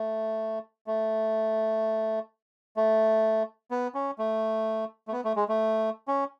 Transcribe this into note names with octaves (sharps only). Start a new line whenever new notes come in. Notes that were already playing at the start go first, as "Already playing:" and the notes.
Already playing: A3
A3
A3
B3
C#4
A3
A3
B3
A3
G#3
A3
C#4